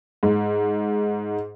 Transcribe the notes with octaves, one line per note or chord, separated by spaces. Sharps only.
G#2